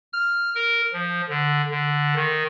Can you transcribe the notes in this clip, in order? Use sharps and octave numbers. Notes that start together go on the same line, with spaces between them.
F6
A#4
F3
D3
D3
D#3